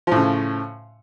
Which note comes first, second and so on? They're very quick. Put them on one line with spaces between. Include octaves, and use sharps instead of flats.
F3 A2 C#3